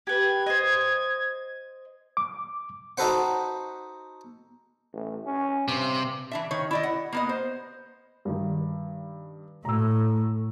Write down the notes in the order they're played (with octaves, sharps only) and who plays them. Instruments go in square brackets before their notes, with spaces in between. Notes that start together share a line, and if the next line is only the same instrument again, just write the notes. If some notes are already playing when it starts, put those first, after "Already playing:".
[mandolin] G4 B4 [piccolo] G#6
[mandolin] C5 D#5
[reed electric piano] D6
[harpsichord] D#4 F#4 A4 B4 C5 F#5
[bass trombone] A1
C#4
[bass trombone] G2 [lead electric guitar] C3
[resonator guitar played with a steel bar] E3 D4 E5
D#3 C#5
E4 D5 D#5
F#5
A#3 B3 D#5
C5
[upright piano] G2 D#3
[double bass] A2 [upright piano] A#5 E6